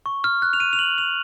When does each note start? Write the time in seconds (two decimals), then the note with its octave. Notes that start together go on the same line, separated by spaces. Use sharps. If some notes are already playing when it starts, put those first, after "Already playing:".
0.06 C#6
0.24 F6
0.42 F#6
0.53 F7
0.60 D#7
0.73 F7
0.79 F#7
0.98 F7